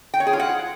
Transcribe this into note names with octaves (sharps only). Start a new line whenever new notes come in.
G5
C#5
G#4
F4
F#5